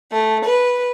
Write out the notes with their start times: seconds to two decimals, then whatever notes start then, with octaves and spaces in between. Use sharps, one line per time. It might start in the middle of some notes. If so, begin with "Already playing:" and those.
0.12 A3
0.44 B4